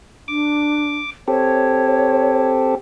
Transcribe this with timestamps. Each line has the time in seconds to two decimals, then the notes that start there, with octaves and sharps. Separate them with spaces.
0.28 D4 D6
1.28 C4 G4 A4 C#5